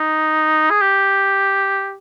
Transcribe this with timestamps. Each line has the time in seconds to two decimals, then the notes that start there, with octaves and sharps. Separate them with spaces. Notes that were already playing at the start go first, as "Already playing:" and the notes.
Already playing: D#4
0.70 G#4
0.81 G4